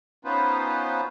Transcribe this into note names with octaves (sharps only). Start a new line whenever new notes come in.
B3 C#4 D#4 F4 B4 C5